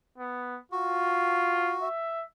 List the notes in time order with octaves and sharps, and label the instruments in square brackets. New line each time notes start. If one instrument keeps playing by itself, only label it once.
[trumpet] B3
[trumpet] F4 [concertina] F#4
[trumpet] E5